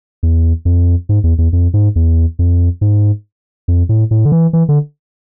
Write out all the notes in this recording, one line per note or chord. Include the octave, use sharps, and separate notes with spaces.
E2
F2
G#2
E2
E2
F2
G#2
E2
F2
G#2
F2
A2
A2
D3
E3
E3
D3